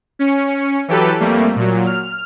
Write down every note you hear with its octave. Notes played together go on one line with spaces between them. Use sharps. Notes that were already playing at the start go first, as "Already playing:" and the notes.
C#4 C#7
E3 F#3 G4 A4 B4
F2 G3 A3 A#3
A#2 F#3
F6